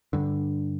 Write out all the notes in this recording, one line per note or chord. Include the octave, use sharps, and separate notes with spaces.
G2 D3